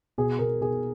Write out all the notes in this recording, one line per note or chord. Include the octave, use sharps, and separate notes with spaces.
B2 G#4
B2 A#4
B2 G#4